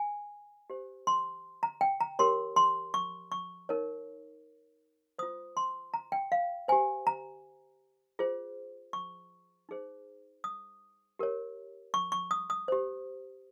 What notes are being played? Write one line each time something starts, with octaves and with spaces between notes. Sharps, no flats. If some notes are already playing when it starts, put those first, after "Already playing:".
Already playing: G#5
G4 C5
C6
A#5
G5
A#5
G4 A#4 C#5 C6
C6
C#6
C#6
D#4 A#4 C#5
F4 C5 D#6
C6
A#5
G5
F5
G4 C5 G#5
A#5
F4 G#4 C5
C#6
D#4 G#4 C5
D#6
G4 A#4 C#5
C#6
C#6
D#6
D#6
G4 C5